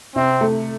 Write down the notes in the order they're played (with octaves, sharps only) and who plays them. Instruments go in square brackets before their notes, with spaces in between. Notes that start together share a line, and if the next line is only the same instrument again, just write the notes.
[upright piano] C3 [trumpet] C4
[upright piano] A3